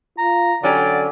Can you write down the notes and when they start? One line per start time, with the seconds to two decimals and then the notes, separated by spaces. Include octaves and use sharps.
0.18 F4 A#5
0.63 D3 F#3 C#4 G4 D5